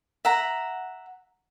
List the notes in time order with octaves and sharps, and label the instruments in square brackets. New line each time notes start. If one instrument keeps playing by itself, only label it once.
[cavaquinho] E5 F#5 A#5